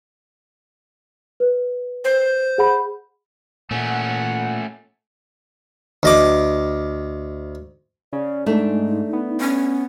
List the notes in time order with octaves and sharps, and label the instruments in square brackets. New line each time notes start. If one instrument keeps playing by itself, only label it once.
[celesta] B4
[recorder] C5
[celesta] G#4 F#5 B5
[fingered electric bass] A#2 [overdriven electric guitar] A3 C#4 [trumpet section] F#5
[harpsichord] D2 D#5 D6
[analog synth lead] C#3 [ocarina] D5
[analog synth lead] G#2 [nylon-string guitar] A3 D4 [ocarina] D#4
[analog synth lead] B3
[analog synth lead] B3 [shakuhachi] C#4